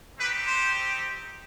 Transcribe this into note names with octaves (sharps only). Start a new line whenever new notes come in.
C4 D#4 G4 B4
C5